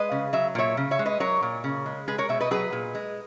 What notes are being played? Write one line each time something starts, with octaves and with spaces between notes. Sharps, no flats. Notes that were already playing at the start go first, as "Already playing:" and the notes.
Already playing: G#3 B4 D#5
C#3
F#3 E5
A#2 C#5 E5
C#3
C#5 E5
G#3
B4 D#5
F#3 A#4 C#5
A#2
C#3
G#3
G#3 G#4 B4
A#4 C#5
B2 C#5 E5
B4 D#5
F#3 G#4 B4
A#2
G#3